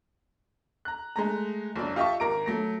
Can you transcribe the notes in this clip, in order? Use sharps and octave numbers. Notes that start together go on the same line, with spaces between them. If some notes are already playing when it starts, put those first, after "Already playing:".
A#5 F#6
G#3 A3 A#5
F#1 F#3 D4
F4 G4 D#5 E5 A5 C#6
G#1 A#4 A#5 D6 D7
F#3 A3 A#6